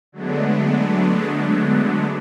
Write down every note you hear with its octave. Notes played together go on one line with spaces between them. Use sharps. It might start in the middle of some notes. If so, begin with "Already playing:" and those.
D3 F#3 G#3 A3 B3 D4